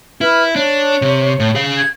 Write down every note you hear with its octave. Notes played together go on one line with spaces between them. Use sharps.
E4 B4 F6
D4 C#5
C3
A2
G#4 F5
G#6